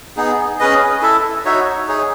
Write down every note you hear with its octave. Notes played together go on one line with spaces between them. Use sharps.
B3 D#4 G#4
C#4 G#4 B4 D#5
E4 A4 E5
D#4 F#4 C#5 E5
D#4 G#4 C#5